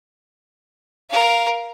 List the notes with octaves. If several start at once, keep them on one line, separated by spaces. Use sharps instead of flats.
A#4 F5